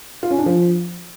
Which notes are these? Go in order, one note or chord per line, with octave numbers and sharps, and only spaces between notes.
F4
C#4
D4
F3